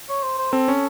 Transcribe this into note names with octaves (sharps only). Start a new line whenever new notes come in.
C#5
C5
C5
C4 A4
C#4